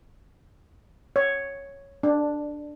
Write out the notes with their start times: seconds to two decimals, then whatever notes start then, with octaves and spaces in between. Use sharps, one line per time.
1.16 C#5
2.03 D4